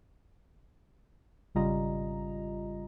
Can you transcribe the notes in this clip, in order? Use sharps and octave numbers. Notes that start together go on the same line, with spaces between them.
G#1 C#3 G3 F4 D#5 A#5